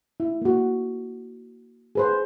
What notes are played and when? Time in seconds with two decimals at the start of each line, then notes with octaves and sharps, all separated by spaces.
0.20 E4
0.42 A#3 F#4
1.95 G#4 B4 C5